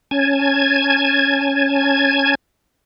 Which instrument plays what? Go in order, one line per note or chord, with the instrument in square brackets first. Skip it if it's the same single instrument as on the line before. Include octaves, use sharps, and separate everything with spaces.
[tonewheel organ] C#4 G#5 A5 G#6